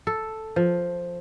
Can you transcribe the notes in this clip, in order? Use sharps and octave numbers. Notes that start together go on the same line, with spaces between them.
A4
F3